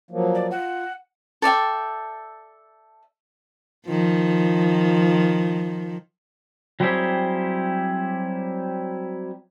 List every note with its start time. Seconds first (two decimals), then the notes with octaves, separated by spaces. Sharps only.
0.11 F3 F#3 A#3
0.35 D5
0.51 F4 F#5
1.42 A4 D5 E5 G5
3.87 D#3 F3
6.80 F#3 G3 C4 E4 G4 G#4